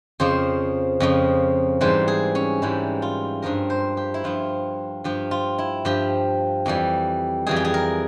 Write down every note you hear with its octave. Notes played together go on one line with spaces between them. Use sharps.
F2 C#3 F3 C5
F2 C#3 F3
G#2 E3 G3 C5
G#4
C#4
G#2 E3 G3 E4
F4
G2 F3 A#4
C5
G4
E4
G2 F3 F4
G2 F3 G4
F4
E4
G2 F3 G4
F2 E3 G3
F2 E3 G3 G#4
G4
G#4
A#4